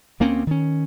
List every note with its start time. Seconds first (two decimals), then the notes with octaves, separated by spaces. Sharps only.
0.20 D2 A#3 C4 C#4
0.47 D#3 C#4